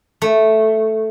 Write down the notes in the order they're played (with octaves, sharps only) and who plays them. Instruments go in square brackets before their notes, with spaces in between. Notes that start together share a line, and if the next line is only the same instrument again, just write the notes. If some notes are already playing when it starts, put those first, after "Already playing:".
[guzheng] A3